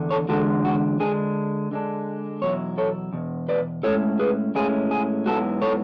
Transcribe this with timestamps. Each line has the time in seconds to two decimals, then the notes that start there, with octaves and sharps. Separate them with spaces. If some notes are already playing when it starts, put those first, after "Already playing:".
Already playing: E2 D3 D4
0.11 A4 C#5
0.29 E2 D3 G#3 D4 F#4 A4
0.65 F#4
1.00 D3 G#3 D4 G#4
1.72 D3 G#3 D4
2.42 E2 B2 F#3 E4 C#5
2.78 A4 C#5
3.13 E2 B2
3.49 B4 D5
3.83 A2 G#3 C#4 E4 A4 C#5
4.19 G#4 B4
4.55 A2 G#3 C#4 E4 G#4
4.91 G#4
5.26 G#2 F#3 B3 E4 F#4 A4
5.62 A4 C#5